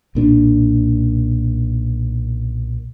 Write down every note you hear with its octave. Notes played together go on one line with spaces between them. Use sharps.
B1 A#2 D4